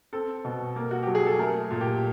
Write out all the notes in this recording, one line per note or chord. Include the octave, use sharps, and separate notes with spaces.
C4 A4
B2
A#3
F#4
F#3 G4
G#4
A4
A3 A#4
A#2
G4